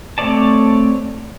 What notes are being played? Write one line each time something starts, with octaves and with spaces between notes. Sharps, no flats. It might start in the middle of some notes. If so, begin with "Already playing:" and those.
A3 C4 C#5 D5 A5